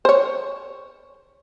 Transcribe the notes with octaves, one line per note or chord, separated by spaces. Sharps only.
C5 C#5